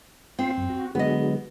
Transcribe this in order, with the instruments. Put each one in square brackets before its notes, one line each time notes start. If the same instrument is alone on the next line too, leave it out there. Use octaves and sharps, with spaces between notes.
[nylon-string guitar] C4 [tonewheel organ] F4 C5 C6
[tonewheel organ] F#2
F#4
[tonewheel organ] D3 F#3 G#3 [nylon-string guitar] B3 D#5